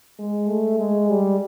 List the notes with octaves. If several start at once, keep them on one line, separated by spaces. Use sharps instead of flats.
G#3
A3
G#3
G3